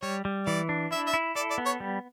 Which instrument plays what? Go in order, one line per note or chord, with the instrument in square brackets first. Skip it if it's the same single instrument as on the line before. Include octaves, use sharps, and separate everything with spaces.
[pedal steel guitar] G3 [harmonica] C#5
[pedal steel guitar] G3
[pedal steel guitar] E3 [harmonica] D5
[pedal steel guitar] D4
[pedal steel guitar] E4 [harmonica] E5
[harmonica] E5
[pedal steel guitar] E4
[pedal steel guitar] A4 [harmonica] D5
[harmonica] D5
[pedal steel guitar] B3
[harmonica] C#5
[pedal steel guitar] G3